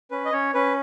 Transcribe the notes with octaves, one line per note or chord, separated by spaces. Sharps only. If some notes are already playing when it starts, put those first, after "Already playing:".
C#4 B4
D#5
C#4 C#5
C#4 B4